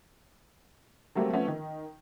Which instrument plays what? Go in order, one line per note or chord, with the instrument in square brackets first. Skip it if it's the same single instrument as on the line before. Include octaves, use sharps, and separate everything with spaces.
[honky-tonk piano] F#3 G3 A3 A#3 C4 G4
F3 A3 B3 C#4
D#3